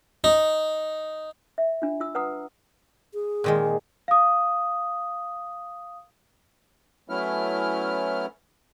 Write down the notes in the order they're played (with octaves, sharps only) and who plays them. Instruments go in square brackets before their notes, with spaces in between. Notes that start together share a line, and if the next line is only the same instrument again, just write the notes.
[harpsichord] D#4
[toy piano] E5
D4 F4
F4 E6
B4 F#5 A#5 D#6
[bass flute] G#4
[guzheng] A#2 D#3 G#3
[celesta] F5 D#6
[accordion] F#3 A3 B3 C#4 E4 F6